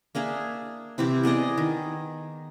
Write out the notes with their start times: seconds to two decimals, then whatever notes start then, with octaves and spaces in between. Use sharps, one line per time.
0.15 A#3 D4 G#4 E5
0.98 C3 E3 C4 E4
1.23 B3 G#4 D5 D#5
1.58 D#3